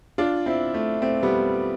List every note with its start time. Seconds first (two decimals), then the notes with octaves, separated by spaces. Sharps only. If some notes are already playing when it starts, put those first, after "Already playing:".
0.18 D4 F4
0.46 C4 E4
0.74 A3
1.02 A3 C4
1.23 G3 B3